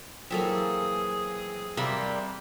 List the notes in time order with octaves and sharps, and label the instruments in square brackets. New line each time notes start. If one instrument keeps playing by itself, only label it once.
[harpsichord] E3 F#3 C4 [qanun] A#3 A4 E5 [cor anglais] G#4
[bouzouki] C3 G3 A#3 [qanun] E5 B5